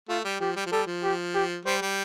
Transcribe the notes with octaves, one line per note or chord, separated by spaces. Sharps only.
A3 F4
G3
F3 G4
G3
F3
G3 A4
F3
G4
G4
G3 C5
G3